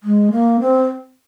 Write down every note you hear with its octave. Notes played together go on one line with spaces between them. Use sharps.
G#3
A#3
C4